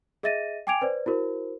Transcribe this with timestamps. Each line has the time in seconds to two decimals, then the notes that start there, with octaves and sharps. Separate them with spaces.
0.23 G#4 D#5 E5 A6 A#6 D#7
0.67 G5 G#5 D6 G#6 D7 F7
0.82 B4 C5 D5
1.06 E4 F#4 A#4 C5